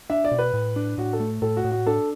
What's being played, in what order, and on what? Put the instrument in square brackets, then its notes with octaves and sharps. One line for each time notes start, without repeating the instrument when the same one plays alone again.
[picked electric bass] D4 [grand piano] E5
[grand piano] D5
[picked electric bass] B2
[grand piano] B4
[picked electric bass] A2
D4
[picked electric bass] A2 [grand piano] F#4
[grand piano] A4
[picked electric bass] A3
[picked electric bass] A2 [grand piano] A4
[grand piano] F#4
[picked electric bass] A2
[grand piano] F#4
[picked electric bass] D4 [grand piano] A4